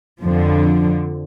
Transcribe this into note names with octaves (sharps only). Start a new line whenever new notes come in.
F2 D3 F3